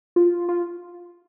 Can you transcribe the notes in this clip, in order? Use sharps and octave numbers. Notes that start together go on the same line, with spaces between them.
F4
F4